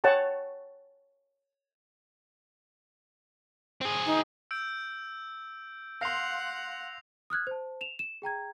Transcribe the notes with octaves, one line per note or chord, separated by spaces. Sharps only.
C#5 F#5 G5 A5 C#6
C4 G#4
D#4
E6 G6 D7
F5 F#5 C6 A#6 C7 F7
D#6 F6 F#6 G#6
C5 A5
E7 F7
E7
G#4 G5 A#5 G#6